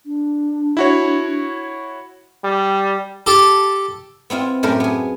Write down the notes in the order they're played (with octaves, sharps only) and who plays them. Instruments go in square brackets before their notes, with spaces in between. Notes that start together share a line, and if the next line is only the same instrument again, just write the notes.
[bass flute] D4
[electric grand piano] E4 F#4 C#5
[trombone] G3
[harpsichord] G4 A4
[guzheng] B3 C4 E4 F4
F#2 A2 A3 E4 G4 A#4
B3 G#4